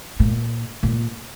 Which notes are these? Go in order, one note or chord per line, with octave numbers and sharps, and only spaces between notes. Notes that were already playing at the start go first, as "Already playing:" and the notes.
A#2
A#2